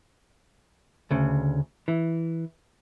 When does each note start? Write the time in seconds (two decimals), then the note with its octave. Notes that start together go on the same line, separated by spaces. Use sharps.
1.11 D2 C#3
1.88 E3